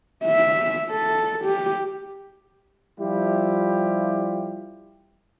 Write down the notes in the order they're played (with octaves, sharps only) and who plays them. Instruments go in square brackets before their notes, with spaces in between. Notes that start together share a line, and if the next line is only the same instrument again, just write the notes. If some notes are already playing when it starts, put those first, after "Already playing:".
[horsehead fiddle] E5
A4
G4
[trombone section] F3 G3 E4 F4 G4